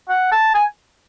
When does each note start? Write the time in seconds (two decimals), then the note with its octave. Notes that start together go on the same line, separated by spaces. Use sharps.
0.09 F#5
0.32 A5
0.54 G#5